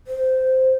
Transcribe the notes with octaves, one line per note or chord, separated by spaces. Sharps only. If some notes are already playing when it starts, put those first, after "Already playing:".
C5